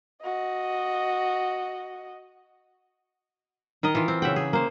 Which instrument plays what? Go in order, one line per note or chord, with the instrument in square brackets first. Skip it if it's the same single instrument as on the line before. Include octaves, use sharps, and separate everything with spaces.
[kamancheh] F#4 D#5
[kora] D#3 A#4 D#5
E3 F4
C4
C#3 E5 F#5 G5
G#4
A#3 C5